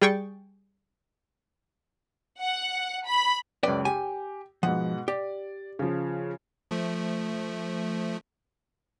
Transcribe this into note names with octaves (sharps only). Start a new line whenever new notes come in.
G3 G#4 G5 C#6 A6
F#5
B5
C#2 F#2 B4 D5 G5
G4 G#5
G#2 B2 F3 F#5
G4 D5
C#3 F3
F3 A3